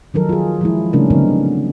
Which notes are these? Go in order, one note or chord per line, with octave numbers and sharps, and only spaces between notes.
D#3 F3 F#3 D#4 A4 A#4
F4 G#4
F3 G#3 E4
C#3 G3 A3 C#4 D4 A#4
D3 F#3 B3 C4 D#4 A#4